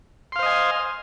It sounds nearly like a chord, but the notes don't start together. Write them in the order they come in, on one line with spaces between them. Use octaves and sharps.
C6 F5 C5 D#5 G#5